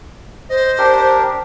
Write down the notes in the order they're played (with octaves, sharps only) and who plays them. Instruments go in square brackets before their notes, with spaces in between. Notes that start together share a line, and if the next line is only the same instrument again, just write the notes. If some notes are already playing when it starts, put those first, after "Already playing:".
[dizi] C5 [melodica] D#5
[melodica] D4 G4 A#4